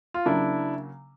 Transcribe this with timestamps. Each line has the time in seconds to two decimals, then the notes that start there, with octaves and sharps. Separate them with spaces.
0.14 F4
0.26 C#3 F#3 A#3 D4 E4